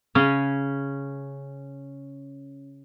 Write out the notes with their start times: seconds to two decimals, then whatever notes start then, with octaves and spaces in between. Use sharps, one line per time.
0.15 C#3 C#4